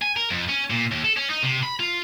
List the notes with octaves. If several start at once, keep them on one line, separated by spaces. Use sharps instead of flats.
G#5
A#4
F2
C#4
A#2
D#2
A4
C#4
D#4
C3
B5
F4